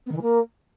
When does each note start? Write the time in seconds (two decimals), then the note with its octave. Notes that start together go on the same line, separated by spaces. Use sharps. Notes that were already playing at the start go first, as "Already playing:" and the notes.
0.06 B3
0.11 D#3
0.17 E3
0.22 A#3